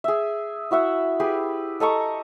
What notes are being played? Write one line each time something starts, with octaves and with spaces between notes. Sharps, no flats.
G#4 E5
E4 F#4 E5 F#5
G4 G#4 B4
A4 D#5 A#5 C#6